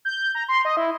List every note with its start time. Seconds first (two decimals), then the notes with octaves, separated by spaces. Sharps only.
0.05 G6
0.35 A#5
0.48 C6
0.65 D#5
0.77 E4